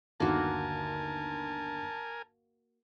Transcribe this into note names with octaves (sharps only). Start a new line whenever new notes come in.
G1 D#2 D3 A#3 F#4 A#4 G#5 A5